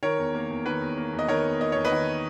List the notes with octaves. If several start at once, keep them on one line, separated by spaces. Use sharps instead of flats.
D#3 A#4 C#5
E2
A#3
E2
D#3 B4
E2
A#3
E2
D#5
D#3 A#4 C#5
E2
A#3 D#5
E2 C#5
B4 D#5
D#3